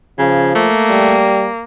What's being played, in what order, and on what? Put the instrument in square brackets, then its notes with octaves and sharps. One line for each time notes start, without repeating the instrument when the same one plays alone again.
[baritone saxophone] C#3 [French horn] F3
[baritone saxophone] A3 [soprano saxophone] A#3
[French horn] G3